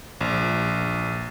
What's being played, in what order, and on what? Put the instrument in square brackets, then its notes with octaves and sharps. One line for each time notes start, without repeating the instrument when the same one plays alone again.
[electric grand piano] A#1